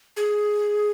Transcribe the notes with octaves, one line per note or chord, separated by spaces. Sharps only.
G#4